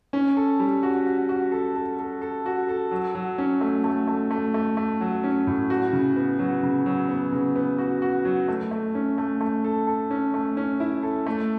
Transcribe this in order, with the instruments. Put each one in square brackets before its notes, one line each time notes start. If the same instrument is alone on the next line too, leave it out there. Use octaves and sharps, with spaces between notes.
[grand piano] C#4
A4
G3
F#4
F#4
F#4
A4
A4
A4
A4
F#4
A4
F#3
F#3
C#4
A3
A3
A3
A3
A3
A3
F#3
C#4
A2
F#4
C#3
B3
F#3
C#3
F#3
B3
C#3
B3
F#4
F#4
F#3
A3
A3
C#4
A3
A3
A4
A4
C#4
A3
C#4
E4
A4
A3